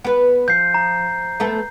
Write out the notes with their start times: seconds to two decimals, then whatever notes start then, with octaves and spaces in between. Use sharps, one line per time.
0.04 B3 B4
0.48 F3 G6 C7
0.74 A#5
1.40 A3 B3 A4